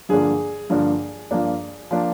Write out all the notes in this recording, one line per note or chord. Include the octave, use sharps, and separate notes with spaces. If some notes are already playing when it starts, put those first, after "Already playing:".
G2 D3 F3 A#3 D4 G#4
G2 D3 F3 A#3 D4
G2 F3 A#3 D4
F3 A#3 D4